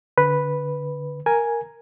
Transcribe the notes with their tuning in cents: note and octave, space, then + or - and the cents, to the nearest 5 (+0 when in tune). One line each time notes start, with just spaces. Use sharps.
D3 -10 B4 -5
A#4 +0 G#5 +0